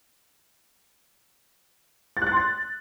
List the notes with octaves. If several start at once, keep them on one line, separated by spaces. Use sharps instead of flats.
A6
F#6
A6
C6
A6